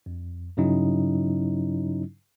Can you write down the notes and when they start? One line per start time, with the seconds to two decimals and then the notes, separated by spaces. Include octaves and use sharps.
0.06 F2
0.57 G2 C#3 F#3 C#4 D#4 E4